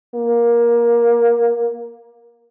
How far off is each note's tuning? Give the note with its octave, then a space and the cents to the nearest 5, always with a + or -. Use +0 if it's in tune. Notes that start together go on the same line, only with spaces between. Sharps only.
A#3 +15